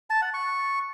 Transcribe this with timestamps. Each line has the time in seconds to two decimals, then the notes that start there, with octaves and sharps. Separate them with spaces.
0.10 A5
0.22 F#5
0.34 C#6